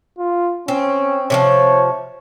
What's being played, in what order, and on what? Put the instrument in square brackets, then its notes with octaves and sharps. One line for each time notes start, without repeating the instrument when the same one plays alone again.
[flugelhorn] F4
[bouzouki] C4 [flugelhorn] C#4
[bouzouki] C3 E3 F3 [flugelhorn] C#5